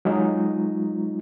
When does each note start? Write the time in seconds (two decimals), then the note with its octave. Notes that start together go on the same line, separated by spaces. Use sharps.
0.05 F#3 G#3 D#4 F4